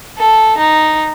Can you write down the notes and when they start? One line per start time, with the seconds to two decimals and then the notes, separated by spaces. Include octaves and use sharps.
0.18 A4
0.58 D#4